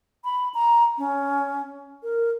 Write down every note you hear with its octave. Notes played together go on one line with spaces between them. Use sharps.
B5
A#5
C#4
A#4